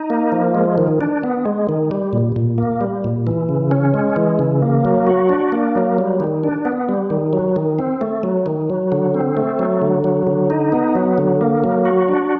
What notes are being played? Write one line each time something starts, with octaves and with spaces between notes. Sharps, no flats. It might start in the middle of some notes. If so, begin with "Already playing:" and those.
Already playing: D#4
A#3
F3
G#3
D#3
D4
B3
G#3
D#3
G3
A#2
A#2
A#3
G3
A#2
E3
C#3
C#4
G#3
E3
C#3
A#3
F#3
F#4
D4
A#3
F#3
G3
D#3
D4
B3
G3
D#3
F#3
D#3
C4
A3
F#3
D#3
F#3
D3
C4
A3
F#3
D3
F#3
D3
D#4
B3
F#3
D3
A#3
F#3
F#4
D4